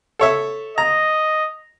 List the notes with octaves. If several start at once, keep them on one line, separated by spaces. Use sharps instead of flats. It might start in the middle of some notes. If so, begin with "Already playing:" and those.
A4 C#5 E5
D#5 A#5